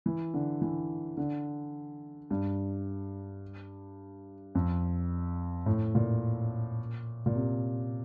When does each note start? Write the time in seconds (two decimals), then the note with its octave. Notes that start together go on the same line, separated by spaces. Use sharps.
0.06 E3
0.34 D3
0.62 E3
1.17 D3
2.30 G2
4.55 F2
5.66 A2
5.95 A#2
7.26 A#2
7.35 C3